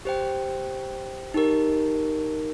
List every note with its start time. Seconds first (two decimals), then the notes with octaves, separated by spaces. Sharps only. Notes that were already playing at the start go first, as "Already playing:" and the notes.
0.05 G4 C5 G5
1.34 D#4 G4 A#4